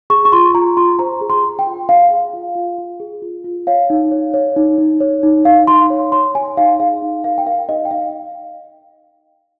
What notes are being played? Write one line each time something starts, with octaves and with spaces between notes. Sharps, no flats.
G#4 C#6
C#6
F4 C6
F4 A#5
F4 C6
C5 A#5
G#4
C6
G#4
G5
F4
G#4 F5
G#4
F4
F4
F4
G#4
F4
F4
C#5 F5
D#4
C#5
C#5
D#4
D#4
C#5
D#4
D#4 F5
D#4 C6
C#5
C#5 C6
C#5 G#5
D#4 F5
G#4 F5
D#4
A#4 F5
G5
A#4 F5
D#4 D#5
G5
D#4 F5